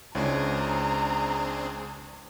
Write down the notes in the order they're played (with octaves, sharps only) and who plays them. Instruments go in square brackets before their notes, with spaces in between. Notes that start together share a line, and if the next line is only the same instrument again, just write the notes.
[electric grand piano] C#2 E4 C#5 [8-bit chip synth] C4 D4 G#4 [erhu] A#5